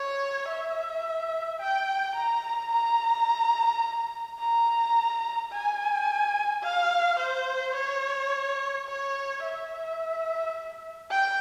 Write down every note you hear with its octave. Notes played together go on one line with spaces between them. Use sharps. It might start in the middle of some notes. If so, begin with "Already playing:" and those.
Already playing: C#5
E5
G5
A#5
A#5
A#5
G#5
F5
C5
C#5
C#5
E5
G5